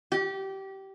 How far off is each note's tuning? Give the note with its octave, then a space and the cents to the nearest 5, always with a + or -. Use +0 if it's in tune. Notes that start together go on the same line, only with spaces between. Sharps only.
G4 -20